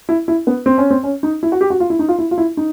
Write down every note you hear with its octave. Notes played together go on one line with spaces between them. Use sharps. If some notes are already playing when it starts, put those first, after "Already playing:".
E4
E4
B3
C4
C#4
C4
C#4
D#4
E4
F#4
G4
F#4
F4
E4
D#4
F4
E4
F4
E4
D#4